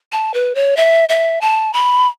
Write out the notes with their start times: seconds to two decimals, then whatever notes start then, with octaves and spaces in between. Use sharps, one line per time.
0.12 A5
0.34 B4
0.55 C#5
0.77 E5
1.09 E5
1.41 A5
1.73 B5